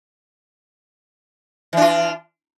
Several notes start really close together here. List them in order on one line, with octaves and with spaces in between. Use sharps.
E3 D4 F4